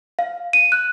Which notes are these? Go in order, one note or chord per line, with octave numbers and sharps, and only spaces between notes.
F5
D#7
F#6